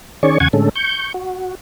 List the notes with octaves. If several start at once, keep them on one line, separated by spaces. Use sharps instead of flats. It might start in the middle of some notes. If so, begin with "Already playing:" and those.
D#3 C#4 G#4 C#5 D5 C#6
E2 C#3 F#5 G#5 C#6 G#6
A2 D3 G#3 C#4 A4
C#6 G6
F#4